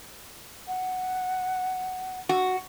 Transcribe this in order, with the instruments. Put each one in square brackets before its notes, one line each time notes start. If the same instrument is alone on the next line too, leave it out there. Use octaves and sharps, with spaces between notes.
[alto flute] F#5
[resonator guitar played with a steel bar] F#4